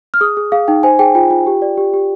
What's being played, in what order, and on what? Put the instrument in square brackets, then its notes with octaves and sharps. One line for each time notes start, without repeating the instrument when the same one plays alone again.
[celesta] F6
G#4 D#6
G#4
G#4 F5
D#4 G5
C5 G#5
G#4 G5
F4 G5
F4 G5
G4
D5
G4
G4